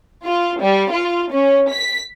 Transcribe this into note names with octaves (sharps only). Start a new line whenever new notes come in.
F4
G3
F4
C#4
B6